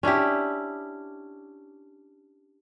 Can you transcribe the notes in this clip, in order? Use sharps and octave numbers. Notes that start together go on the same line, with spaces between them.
C#4 D4 E4 G4